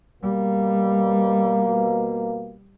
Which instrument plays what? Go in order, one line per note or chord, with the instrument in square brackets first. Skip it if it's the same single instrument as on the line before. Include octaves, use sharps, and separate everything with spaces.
[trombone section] B2 A#3 [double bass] G3